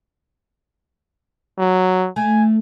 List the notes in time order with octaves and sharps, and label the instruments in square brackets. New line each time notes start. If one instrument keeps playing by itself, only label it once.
[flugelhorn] F#3
[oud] A3 [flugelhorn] G#5